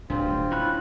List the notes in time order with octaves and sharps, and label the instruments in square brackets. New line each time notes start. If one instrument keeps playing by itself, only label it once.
[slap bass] D1 D2 G2 [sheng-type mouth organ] C4 F4 [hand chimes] D4
[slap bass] C#4 [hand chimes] E4 [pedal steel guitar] F#4 B5 F#6